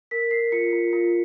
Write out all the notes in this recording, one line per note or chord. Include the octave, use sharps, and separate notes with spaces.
A#4 B6
A#4 C7
F4 C#7
F4
F4